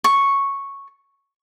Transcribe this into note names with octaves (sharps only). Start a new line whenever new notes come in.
C#6